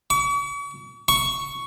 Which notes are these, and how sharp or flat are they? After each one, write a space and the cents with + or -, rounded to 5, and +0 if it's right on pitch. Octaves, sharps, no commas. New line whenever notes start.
C#6 +45
C#6 +5